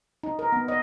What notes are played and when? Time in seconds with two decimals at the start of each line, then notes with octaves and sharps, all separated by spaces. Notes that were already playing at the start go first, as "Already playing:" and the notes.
0.23 D#4
0.39 A#4
0.52 B3
0.68 D#5